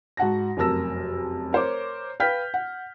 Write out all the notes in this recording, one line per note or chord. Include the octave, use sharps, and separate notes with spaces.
G#2 F#4 F#5 A5 A#6
F1 F#2 A#4 A5 E6 A#6
A#4 C5 C#5 D6
B4 F5 G5 F6 G6 B6
F#5